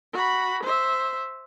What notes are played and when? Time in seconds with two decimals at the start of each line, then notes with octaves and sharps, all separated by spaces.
0.13 F#4 B5
0.63 C5 E5